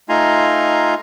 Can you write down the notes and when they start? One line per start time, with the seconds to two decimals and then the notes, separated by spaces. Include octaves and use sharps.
0.09 A3 D#4 F4 G#5 A#5 C6